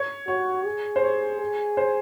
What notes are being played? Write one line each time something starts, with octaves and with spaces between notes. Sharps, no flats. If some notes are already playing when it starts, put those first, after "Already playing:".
Already playing: C#5
F#4 C#5
G#4
C5
C#5
G#4
C5